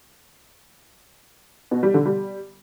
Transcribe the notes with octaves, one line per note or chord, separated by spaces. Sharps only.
B2
G3
D3
G3